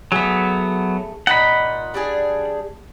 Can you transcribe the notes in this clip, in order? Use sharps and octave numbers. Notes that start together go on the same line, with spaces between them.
F#3 A3 B3 G#4
A#2 D#4 D#5 F#5 B5
G3 D4 G#4